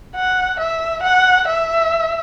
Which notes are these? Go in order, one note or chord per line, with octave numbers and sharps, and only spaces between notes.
F#5
E5
F#5
E5